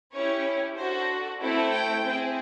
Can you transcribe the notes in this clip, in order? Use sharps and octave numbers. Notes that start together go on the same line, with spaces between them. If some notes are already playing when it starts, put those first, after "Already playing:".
C#4 E4 G4 C#5
D4 F#4 A4 C5
A3 C4 E4 A4
G5
C4 E4 G#4